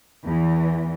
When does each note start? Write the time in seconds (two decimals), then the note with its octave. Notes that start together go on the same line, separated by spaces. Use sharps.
0.24 E2 E3